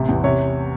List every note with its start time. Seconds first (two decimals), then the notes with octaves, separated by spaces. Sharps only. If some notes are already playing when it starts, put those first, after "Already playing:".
Already playing: A1 C3
0.09 E2
0.24 C3 C#5